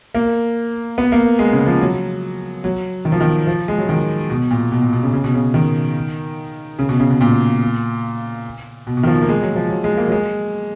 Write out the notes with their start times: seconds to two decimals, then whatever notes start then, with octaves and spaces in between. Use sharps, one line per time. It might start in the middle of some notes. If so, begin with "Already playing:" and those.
0.15 A#3
0.98 B3
1.12 A#3
1.39 G#3
1.52 C#3
1.66 F3
1.81 F#3
2.64 F#3
3.05 D#3
3.12 F3
3.21 D#3
3.47 F3
3.68 G#3
3.78 F#3
3.89 D#3
4.30 B2
4.51 A#2
4.72 B2
4.82 A#2
4.93 B2
5.03 C#3
5.13 C#3
5.24 B2
5.34 C#3
5.54 D#3
6.79 C#3
6.89 B2
7.00 C#3
7.10 B2
7.21 A#2
8.87 B2
8.97 B2
9.03 D#3
9.07 F3
9.22 A#3
9.29 G#3
9.42 F#3
9.56 F3
9.69 F#3
9.84 G#3
9.97 A#3
10.08 F#3
10.12 G#3